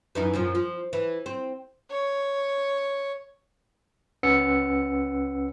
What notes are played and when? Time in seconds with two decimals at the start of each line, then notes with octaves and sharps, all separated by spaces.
0.15 F#2 E3 D#4
0.34 F#2 A#2 F3
0.55 F3
0.93 E3
1.26 C4
1.91 C#5
4.23 C#2 C#4 B4 F#5 E6 C#7